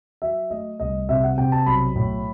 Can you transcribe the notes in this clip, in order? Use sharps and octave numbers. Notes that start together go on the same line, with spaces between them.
F#3 E5
A3 D#5
C2 D#5
C3 E5
F#5
C3 G5
A5
B1 B5
A2